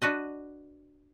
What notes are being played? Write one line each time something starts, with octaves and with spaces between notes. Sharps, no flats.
D4 F#4 B4 D#5